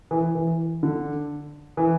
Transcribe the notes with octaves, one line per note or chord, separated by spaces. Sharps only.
E3
E3
D3
E3